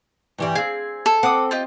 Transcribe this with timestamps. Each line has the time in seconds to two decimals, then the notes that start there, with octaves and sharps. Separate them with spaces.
0.38 G2 E3 G3
0.55 C4 G#4 F5
1.06 A4
1.23 C4 F#5 D6 D#6
1.51 F4 G4 D#5